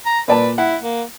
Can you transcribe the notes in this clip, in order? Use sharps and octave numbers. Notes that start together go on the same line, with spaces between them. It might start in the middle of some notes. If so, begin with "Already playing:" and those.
A#5
A#2 B4 D5 A5
E4 F#5
A#3